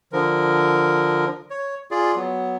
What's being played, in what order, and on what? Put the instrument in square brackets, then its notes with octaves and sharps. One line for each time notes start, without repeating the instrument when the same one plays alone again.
[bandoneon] D3 F3 A#4
C#5
F4 G#4 D5
F#3 B3